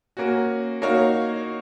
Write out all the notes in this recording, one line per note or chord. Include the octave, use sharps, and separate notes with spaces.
A#3 C#4 F#4
A#3 D#4 F#4 C#5 F5